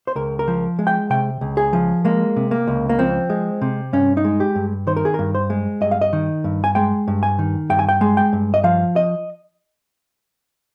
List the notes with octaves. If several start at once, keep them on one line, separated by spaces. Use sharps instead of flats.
C5
C#2 A#4
A#4
F3
G#3
G5
C3 G5
C#2
G#4
F3
G#3 A#3
C3
A#3
C#2
A#3
F3 C4
G#3
C3
G2 C#4
D#4
G#3
G4
G2
D#3 C5
A#4
G#4
G2 A#4
C5
G#3
G2 D#5
F5
D#5
D#3
G2
G#5
G#3 G5
G2
G#5
D#3
G2 G5
G#5
G5
G#3
G5
G2
D#5
F3 F5
D#5